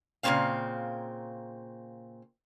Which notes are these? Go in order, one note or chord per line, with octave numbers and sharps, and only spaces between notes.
A#2 C#3 F3 A#3 C4 F5